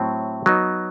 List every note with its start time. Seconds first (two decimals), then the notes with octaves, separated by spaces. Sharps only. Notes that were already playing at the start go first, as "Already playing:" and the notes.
Already playing: A2 F#3 C4
0.46 F#3 B3 D#4